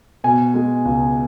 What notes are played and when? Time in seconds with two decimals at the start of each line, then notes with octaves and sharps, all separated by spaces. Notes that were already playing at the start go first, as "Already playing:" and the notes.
0.24 B2 G#5
0.54 G#3
0.85 C#2